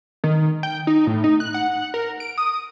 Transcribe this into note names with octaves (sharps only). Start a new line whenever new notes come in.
D#3
G5
D#4
A2
D#4
F#6
F#5
A#4
D7
D#6